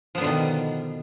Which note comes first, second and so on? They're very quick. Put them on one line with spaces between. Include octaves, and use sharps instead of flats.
F3 B3 D3 B2 D#3